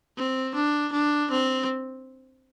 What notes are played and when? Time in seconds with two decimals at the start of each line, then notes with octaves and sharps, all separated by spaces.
0.17 C4
0.55 D4
0.93 D4
1.31 C4